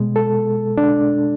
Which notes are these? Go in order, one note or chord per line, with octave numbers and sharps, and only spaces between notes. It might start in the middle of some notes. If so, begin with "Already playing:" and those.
Already playing: B2 G#3
A4
D4